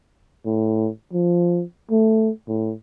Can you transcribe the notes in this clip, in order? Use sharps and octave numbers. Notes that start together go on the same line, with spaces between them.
A2
F3
A3
A2